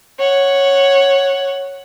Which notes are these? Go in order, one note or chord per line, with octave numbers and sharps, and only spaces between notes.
C#5 F#5